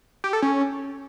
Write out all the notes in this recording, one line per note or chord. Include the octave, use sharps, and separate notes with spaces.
G4
A4
C#4